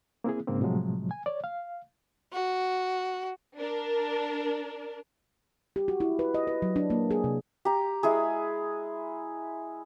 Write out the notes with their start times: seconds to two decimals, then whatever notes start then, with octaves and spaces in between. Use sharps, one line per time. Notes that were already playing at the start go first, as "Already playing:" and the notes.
0.24 A#3 C4 E4 G#4
0.47 G#2 C#3 A#3 C4
0.61 A2 C3 F3 F#3 G#3
1.11 G#5
1.26 C#5 D5
1.44 F5
2.33 F#4
3.58 D4 A#4
5.76 G4
5.88 F#4
6.00 E4
6.19 B4
6.34 D#5
6.47 B4
6.62 F#3
6.76 D4
6.90 A#3
7.11 G#4
7.24 C3
7.65 G4 A#5
8.03 G#3 E4 G#4